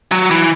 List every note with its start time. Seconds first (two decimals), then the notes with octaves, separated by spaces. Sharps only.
0.12 F#3
0.31 E3